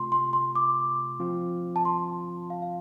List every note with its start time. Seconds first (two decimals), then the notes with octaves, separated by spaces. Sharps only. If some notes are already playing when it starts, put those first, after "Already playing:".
Already playing: C3 A3 F4 C6
0.12 C6
0.33 C6
0.55 D6
1.20 F3 C4 F4
1.76 A5
1.85 C6
2.50 F5
2.62 F5